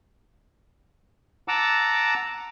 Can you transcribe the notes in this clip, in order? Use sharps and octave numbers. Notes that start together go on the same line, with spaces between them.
F#5 A5 A#5 D6 E6